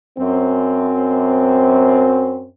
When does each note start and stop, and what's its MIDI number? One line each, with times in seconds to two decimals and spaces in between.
0.19 2.48 42
0.19 2.48 60